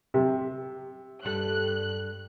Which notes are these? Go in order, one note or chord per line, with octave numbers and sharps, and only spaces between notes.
C3
G2 G3 A4 F#6